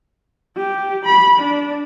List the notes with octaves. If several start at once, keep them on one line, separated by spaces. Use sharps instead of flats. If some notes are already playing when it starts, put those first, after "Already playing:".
G4
B5
D4